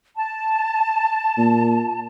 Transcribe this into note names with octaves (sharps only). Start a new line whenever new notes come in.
A5
A#2